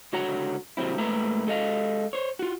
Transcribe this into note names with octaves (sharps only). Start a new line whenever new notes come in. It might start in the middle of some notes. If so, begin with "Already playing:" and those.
C#2 D3 F#4 C#5 F#5 A#5
D#2 C3 F#3 C4 E4
G#2 A3 A#3 B4 E5 A#5
G#3 A4 D#5 F5
C5 C#5
F4 F#4